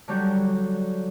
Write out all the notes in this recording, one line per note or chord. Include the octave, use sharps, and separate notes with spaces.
D3 F#3 G3 G6